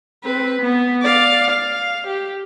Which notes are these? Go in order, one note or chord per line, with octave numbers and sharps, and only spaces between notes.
C4 B4
B3
D5 F5
F5
G4